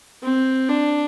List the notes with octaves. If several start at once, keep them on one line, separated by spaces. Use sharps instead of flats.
C4
D4